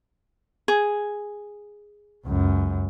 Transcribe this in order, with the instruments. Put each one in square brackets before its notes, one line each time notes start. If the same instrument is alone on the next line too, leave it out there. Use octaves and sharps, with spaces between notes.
[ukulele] G#4
[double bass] C#2 F#2